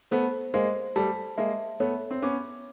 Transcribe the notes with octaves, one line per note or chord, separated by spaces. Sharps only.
A3 B3 C5
G#3 A#3 C5
G3 A3 A5
G#3 A#3 E5
A3 B3 C#5
C4
B3 C#4 D6